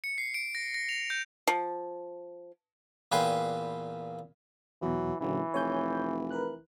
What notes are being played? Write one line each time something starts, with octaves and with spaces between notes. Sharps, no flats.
C#7
C7
D7
A#6
A#6
F7
G6
F3
E2 A#2 B4 G5 G#5 C6
E2 B2 E3 F#3
F#1 A#2 D3 E3 F#3
F1 C#5 G#5 G6
A#4 B4 F#6